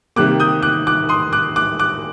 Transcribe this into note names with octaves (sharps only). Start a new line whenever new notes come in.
C3 D#3 G3 A#3 D6 F#6
D#6 G6
D6 F#6
D6 F#6
C6 D#6
D6 F#6
D6 F#6
D6 F#6